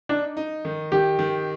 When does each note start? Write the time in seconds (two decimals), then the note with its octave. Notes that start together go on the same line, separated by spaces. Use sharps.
0.09 D4 D#4
0.37 D#4
0.65 D#3
0.92 D#3 G4
1.19 D#3